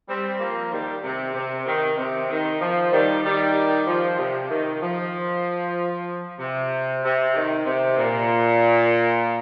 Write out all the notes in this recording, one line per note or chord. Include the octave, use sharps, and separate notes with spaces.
G3 C4
F3 A#3
D#3 G3
C3
C3
D#3
C3
D#3
F3
D#3 G3
D#3 G3
F3
C3
D#3
F3
C3
C3
D#3
C3
A#2